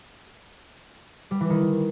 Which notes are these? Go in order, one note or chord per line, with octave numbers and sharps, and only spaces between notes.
G3
E3
D#3